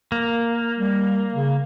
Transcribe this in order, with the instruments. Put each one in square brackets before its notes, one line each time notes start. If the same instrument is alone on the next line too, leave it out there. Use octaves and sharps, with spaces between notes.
[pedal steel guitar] A#3
[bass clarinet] G3
C#3